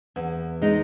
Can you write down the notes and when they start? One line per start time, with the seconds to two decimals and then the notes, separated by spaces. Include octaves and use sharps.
0.16 E2
0.62 G#3 D#4